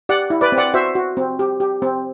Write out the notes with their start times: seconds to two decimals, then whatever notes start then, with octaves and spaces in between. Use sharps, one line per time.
0.09 G4 D5 F#5
0.30 E4
0.41 B4 D5
0.52 C4
0.58 D5 F#5
0.74 F#4 C5 E5
0.95 F#4
1.17 C4
1.39 G4
1.60 G4
1.82 C4